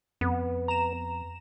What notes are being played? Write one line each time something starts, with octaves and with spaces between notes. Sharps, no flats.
F2 B3
A#5 E7